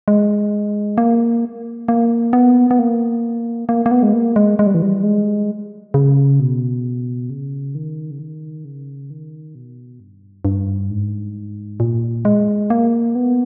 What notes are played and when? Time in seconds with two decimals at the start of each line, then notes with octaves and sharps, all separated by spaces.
0.08 G#3
0.98 A#3
1.88 A#3
2.33 B3
2.71 B3
2.79 A#3
3.69 A#3
3.86 A#3
3.91 B3
4.03 G#3
4.13 A#3
4.36 G#3
4.59 G#3
4.66 G3
4.75 E3
4.82 G3
5.03 G#3
5.94 C#3
6.40 B2
7.30 C#3
7.75 D#3
8.11 C#3
8.19 D#3
8.65 C#3
9.10 D#3
9.55 B2
10.00 G2
10.45 G2
10.90 G#2
11.80 A#2
12.25 G#3
12.70 A#3
13.15 B3